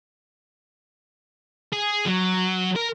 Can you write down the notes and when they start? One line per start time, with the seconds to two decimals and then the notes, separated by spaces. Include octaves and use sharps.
1.73 G#4
2.07 F#3
2.76 A#4